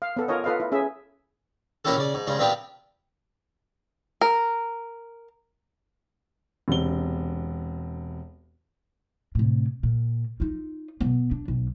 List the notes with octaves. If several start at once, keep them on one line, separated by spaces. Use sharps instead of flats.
F5
B3 A4
F4 A#4 C#5 D#5
F4 A4 B4 D#5 F5
E4
C#4 G#4 E5
A#2 A#3 C#4 E4 G4 A4
C#3 D5
G#2
G2 C#3 G#3
A#2 B3 C4 D4 F4 G4
A#4
E1 C3 G7
A2 C3
A#2
D#4 F4
B2 B3
D4
B1